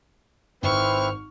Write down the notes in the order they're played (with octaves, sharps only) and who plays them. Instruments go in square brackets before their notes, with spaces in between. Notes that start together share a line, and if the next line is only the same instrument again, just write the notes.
[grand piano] G#1 [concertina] C4 E4 B4 [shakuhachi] C5 [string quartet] C#6 F6